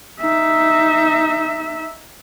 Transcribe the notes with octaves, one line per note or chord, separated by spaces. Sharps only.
D#4 E5